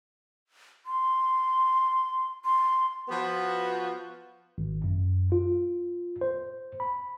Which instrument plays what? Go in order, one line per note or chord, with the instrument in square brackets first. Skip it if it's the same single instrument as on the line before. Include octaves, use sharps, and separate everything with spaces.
[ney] C6
C6
[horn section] F3 B3 F#4
[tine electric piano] G#1
F#2
F4
C5
B5